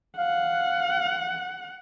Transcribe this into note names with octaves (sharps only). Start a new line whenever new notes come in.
F5 F#5